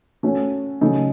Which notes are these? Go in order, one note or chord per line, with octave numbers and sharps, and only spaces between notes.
A3 C#4 F#4 C#5
C#3 F#3 A3 D#4 A4